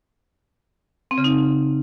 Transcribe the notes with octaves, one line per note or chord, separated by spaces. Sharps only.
C4
C#3
D#4